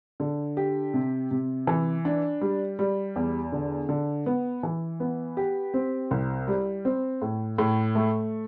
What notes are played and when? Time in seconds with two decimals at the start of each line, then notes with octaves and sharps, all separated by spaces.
0.20 D3
0.57 G4
0.94 C3
1.31 C3
1.67 E3
2.05 D4
2.41 G3
2.79 G3
3.16 E2
3.52 D3
3.89 D3
4.26 B3
4.63 E3
5.00 B3
5.37 G4
5.74 C4
6.11 C2
6.48 G3
6.85 C4
7.22 A2
7.58 A2
7.95 A3